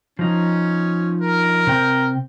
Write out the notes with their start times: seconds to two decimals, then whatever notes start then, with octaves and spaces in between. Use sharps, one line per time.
0.19 F3 C#4 D#4
1.21 A#4
1.67 C3 C4 G5